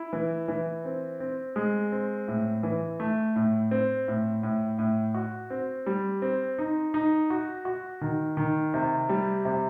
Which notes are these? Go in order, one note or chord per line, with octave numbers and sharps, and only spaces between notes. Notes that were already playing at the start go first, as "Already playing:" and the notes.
Already playing: E4
E3
E3
C4
C4
G#3
C4
A2
E3
A3
A2
C4
A2
A2
A2
F#4
C4
G3
C4
D#4
D#4
F#4
F#4
D#3
D#3
C3
G3
C3